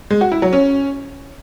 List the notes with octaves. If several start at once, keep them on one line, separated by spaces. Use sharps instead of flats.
G#3
F#4
E4
F#3
C#4